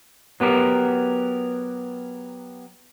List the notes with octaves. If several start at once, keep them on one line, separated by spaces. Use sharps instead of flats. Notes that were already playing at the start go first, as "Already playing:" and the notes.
F#3 B3 G4 A#4